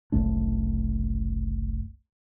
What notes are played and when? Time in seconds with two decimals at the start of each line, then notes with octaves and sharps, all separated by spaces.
0.12 F#1 C2 A3 D4